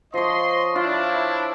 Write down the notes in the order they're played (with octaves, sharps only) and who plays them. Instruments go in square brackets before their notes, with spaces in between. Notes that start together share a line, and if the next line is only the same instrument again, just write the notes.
[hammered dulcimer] F3 C#5 [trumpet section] D#5 C6
[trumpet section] D4 E4 [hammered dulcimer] F4